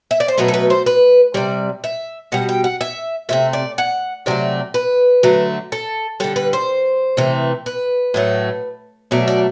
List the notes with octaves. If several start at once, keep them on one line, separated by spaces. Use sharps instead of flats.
E5
D5
C5
B2 F#3 A3 B4
A4
B4
C5
B4
C3 G3 D5
E5
B2 G3 F#5
G5
F#5
E5
C3 E3 A3 E5
D5
F#5
C3 F#3 A3 D5
B4
D3 F#3 A3
A4
D3 G3 A4
B4
C5
C3 E3 A3
B4
A2 F#3 A3
B2 F#3 A3 D5
D5